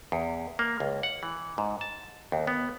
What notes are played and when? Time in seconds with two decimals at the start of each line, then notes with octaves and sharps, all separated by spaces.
0.12 E2
0.59 A#3
0.80 C#2
1.03 F#5
1.23 E3
1.58 G#2
1.81 A5
2.32 D#2
2.47 B3